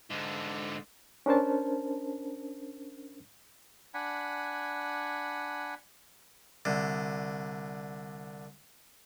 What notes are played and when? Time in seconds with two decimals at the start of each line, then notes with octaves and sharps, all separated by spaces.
0.11 G#2 D3
1.26 C#4 D4 A#4 C5 A5
3.94 D4 F#5 G#5 B5
6.65 C2 D3